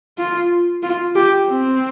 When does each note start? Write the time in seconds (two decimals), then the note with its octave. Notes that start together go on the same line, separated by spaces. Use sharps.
0.18 F4
0.83 F4
1.16 G4
1.48 C4